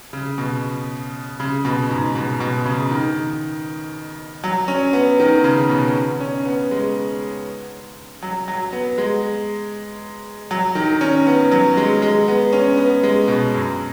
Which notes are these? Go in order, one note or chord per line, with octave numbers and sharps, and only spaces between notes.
C#3
B2
C#3
B2
G#2
B2
B2
C#3
D#3
F#3
C#4
B3
D#3
C#3
B2
C#4
B3
G#3
F#3
F#3
B3
G#3
F#3
D#3
C#4
B3
F#3
G#3
G#3
B3
C#4
B3
G#3
B2
F#2